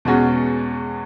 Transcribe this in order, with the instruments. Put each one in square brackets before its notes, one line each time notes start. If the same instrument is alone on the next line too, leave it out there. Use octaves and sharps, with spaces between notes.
[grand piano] E2 B2 G#3 C#4 F#4